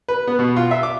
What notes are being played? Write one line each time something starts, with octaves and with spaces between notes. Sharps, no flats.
B4
B3
B2
F4
E5
D6